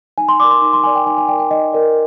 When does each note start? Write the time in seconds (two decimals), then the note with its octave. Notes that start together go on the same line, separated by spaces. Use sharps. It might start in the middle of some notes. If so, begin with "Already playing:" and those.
0.18 D#4 G#5
0.29 C6
0.40 A#4 D5 D6
0.51 C6
0.62 D#4 C6
0.73 C6
0.84 A#4 D5 G#5
0.95 G5
1.06 D#4 G#5
1.18 G#5
1.28 D5 G5
1.32 A#4
1.39 G5
1.50 D#4 D#5
1.72 A#4 D5